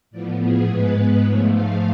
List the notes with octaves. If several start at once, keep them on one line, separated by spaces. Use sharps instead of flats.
A2 F3 B3 D5
G#4
G#2 G#3 B3 B4
G#2 F3 A3 C#5
F5